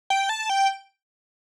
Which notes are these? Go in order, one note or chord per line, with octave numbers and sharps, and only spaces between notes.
G5
A5
G5